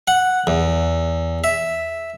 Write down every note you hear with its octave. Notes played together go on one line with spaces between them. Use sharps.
F#5
E2
E5